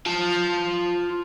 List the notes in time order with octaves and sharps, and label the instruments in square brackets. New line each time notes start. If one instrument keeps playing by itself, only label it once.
[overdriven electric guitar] F4 A5